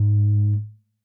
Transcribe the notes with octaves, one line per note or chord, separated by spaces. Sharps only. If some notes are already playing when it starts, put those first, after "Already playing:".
Already playing: G#2